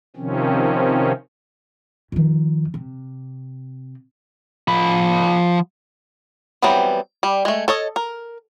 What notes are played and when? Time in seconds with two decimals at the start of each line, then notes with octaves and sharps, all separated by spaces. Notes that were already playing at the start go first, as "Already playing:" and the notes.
0.16 C3 D#3 F3 C4 C#4
2.12 F2 D#3
2.74 C3
4.68 F3 B5
6.62 E3 F#3 G3 B3 C4
7.23 G3
7.45 G#3 A3
7.68 A4 C#5 D#5
7.96 A#4